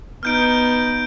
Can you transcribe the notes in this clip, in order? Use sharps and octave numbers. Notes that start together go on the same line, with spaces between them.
B3 D#4 F6 G6 D7